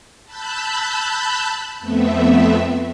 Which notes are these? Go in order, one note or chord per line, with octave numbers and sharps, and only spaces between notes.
A5 B5 E6 F#6 G6
F2 A3 B3 C4 E5